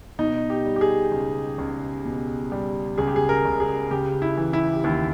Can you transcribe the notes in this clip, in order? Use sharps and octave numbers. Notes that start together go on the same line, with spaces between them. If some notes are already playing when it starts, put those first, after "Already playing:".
B2 D#4
G4
G3
G4
G#4
C#2
C#2
B2
G3
C#2 G#4
G4
G#4
A#4
C#2
G#4
C#3 G4
E4
E3
E4
G4
D#2 E4